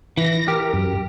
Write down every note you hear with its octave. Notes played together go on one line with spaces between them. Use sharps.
E3 A#6
G4 A#4
F#2